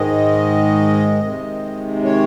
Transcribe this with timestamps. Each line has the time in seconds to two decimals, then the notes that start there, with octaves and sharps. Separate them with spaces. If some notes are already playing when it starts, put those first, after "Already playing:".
Already playing: G#2 D#3 G#3 D#5
1.20 C3 D#3 G#3
2.04 C#5